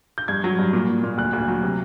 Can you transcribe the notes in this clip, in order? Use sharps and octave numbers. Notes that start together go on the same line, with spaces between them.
G6
G2 G#6
F#3
G2
A#2
A#2
A#2
D2 F#6
D2
F#3
C3